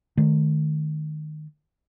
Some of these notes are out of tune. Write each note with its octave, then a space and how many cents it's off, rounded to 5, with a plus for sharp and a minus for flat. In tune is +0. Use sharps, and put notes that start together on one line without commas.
D#3 -25 A3 -35